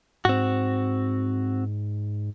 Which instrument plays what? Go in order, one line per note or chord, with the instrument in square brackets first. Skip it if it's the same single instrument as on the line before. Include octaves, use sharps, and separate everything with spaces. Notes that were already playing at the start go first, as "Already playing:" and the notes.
[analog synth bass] G#2 [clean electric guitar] C4 F#4